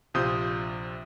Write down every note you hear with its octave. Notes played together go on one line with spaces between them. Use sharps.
A#1 C3 F4 D#6 G6